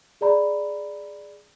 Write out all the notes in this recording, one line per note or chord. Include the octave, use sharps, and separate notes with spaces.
G#4 D5 A#5 B5